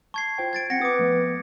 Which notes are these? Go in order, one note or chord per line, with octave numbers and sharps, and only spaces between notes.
A5 C#6 G#6 C7
F4 C5 G5
G#6 A6 D7
C4 F#5 A#6 C#7
B4 D6 D#6
F3 A3 B3